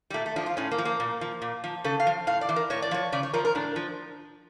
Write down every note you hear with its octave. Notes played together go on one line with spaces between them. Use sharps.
G3
A#2 A3
A3
F3 D4
F4
A2 C#4
A#3
F3
A#3
A#2
F3
A#2
F3
C#3 A4
F5
F3
A2 F5
D5
E3
A#4
A2 C#5
D5
F3 C#5
C#3 D5
C#5
F3 A#4
A#4
A2 D4
F3